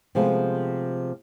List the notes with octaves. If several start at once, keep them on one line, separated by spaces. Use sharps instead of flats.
C3 F3 G#3 A3 B3